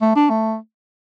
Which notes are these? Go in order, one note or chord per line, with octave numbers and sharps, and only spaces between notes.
A3
D4
A3